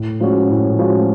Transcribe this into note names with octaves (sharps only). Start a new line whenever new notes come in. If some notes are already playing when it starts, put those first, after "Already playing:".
Already playing: A2
F3 G#3 C#4 F#4
A2
F3 G#3 C#4 F#4